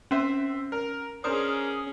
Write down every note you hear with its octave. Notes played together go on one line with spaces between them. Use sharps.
C4 C#4 C5 E5
A#4
C#4 D4 G#4 A#4 C5 D#6